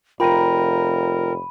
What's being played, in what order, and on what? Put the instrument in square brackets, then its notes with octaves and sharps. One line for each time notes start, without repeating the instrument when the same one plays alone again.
[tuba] F1 [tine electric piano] F4 G5 A#5 [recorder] A#4 [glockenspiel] B5 D#7